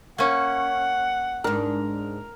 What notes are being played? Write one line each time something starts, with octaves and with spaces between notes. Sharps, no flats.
A#3 C#4 F#5
G#2 D4 A#4